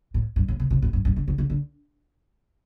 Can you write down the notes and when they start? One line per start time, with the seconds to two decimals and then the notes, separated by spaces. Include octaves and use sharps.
0.14 A2
0.36 G2
0.48 A2
0.60 C3
0.70 C3
0.82 A2
0.93 G2
1.05 G2
1.16 D3
1.28 D3
1.38 D3
1.50 D3